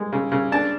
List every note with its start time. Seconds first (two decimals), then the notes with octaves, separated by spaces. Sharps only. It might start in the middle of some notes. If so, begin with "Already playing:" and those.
Already playing: G#3
0.12 C#3
0.32 C#3
0.52 D4 A5